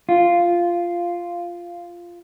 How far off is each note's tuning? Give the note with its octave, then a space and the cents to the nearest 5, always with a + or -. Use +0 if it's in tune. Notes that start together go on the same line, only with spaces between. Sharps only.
F4 -5